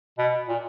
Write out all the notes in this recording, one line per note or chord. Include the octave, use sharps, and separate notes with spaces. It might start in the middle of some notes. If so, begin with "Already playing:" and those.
B2
A#2